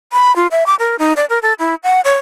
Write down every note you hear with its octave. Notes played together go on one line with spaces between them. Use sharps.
B5
F4
E5
D6
A#4
D#4
D5
A#4
A4
E4
F#5
C#5